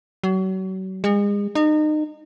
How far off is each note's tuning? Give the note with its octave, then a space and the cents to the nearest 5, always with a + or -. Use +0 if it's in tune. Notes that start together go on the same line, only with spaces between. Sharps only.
F#3 +35
G#3 -35
D#4 -30